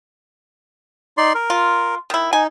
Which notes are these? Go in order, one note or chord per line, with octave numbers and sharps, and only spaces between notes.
D#4 D5 C6
A#4
F4
D#3 E4
D#4 G#5